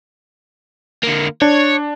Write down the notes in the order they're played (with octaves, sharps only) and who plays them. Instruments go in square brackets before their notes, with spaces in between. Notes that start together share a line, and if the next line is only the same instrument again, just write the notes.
[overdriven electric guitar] D3 A#3
[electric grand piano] D4 [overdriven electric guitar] C#5